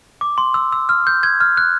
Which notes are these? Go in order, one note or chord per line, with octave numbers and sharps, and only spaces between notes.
D6
C6
E6
E6
F6
G6
G#6
F6
F#6